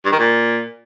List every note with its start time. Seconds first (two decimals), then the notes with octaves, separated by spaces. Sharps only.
0.05 G2
0.12 D#3
0.19 A#2